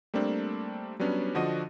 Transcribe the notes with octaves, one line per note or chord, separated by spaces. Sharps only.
G3 A3 A#3 C4 D4
F#3 G3 B3 C#4 D4
D3 F3 D4 F#4 D#5 D#7